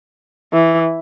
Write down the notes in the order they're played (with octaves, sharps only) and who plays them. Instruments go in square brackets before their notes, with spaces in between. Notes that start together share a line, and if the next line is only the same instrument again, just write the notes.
[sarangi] E3